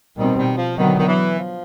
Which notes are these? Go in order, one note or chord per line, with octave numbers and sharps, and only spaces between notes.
B2 D#3 G3 C4
D#3
F3
D3 D#3 F#3 B3
D#3
E3
F3